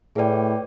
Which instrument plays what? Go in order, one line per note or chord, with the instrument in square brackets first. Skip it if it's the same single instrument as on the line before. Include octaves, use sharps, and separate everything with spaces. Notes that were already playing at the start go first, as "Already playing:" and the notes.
[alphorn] A2 [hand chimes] G#4 B4 D5 G5